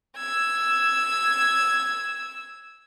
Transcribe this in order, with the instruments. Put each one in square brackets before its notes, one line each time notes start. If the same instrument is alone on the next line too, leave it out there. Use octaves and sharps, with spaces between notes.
[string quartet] E6 G#6